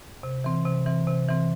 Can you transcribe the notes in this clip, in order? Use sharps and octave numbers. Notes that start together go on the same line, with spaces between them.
C3
E3 C4
C3
E3 C4
C3
E3 C4